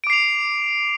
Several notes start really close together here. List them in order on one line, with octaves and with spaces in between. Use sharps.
D7 D6 C7 F7